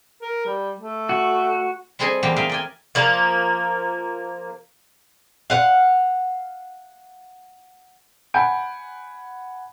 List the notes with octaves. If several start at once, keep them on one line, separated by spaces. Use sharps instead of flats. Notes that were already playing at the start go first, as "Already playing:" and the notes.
A#4
G3
A3
F#4
G3 C4 G#4 A4 D#5 G#5
E2 G3 A#3 G4
G#4 A#4 E5 F5 G5 G#5
D5 G5 G#5
F3 A#3
F5 F#5
F#5 G#5 B5 G6 D7